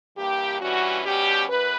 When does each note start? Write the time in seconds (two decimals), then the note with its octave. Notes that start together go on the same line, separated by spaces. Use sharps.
0.16 G2 E3 A#3 G4
0.60 G2 E3 G3 C#4 F#4
1.03 B2 G3 C#4 G4
1.47 F#2 B4